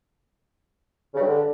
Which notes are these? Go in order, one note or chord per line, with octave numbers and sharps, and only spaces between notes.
C#3
G2
D3